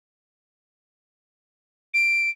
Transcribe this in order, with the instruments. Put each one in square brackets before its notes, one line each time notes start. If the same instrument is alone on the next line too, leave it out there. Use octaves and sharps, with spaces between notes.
[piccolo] D7